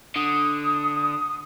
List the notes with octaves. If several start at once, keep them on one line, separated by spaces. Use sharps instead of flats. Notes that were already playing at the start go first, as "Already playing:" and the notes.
D3 D#6